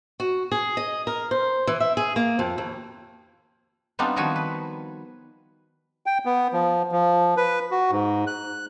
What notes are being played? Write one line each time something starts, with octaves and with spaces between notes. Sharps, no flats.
F#4
G#4
D#5
A#4
C5
E3
E5
G#4
A#3
F2
D#2
G3 B3 C4 D4 D#4 F4
D#3 F3 G3 F#4 G#5
B4
G5
B3
F3
F3
B4
F#4
G#2
F#6